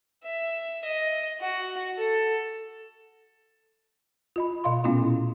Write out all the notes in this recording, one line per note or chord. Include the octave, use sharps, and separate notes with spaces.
E5
D#5
F#4
A4
F4 D#5 B5
B2 D#5 F5 C6
A#2 A3 B3 C#4 E4 F4